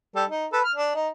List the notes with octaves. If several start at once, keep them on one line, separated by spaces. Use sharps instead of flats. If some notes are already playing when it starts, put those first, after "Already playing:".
G3 A4
D#4
A4 B4
F6
D4
D#4